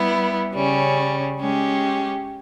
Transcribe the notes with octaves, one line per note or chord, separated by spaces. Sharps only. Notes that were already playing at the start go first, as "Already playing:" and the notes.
Already playing: G3 B3 E4
C#3 G3 C#4
G#3 C#4 G4